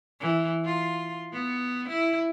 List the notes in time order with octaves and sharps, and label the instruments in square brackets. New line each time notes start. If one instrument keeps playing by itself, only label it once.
[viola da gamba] E3
F4
B3
E4